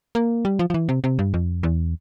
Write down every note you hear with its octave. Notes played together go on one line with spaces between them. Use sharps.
A#3
G3
F3
F3
E3
C3
C3
G2
F2
E2